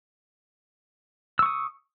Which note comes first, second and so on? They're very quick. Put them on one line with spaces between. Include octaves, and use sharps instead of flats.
E6 C#6 D#6